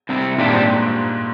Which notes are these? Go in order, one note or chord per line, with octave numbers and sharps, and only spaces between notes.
C3 G3 C4
G2 A#2 D#3 G#3 D4 G4
G#2